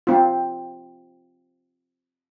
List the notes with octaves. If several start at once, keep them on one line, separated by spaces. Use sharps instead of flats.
C4 F4